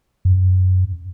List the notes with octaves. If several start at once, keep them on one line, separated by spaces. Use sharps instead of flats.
F#2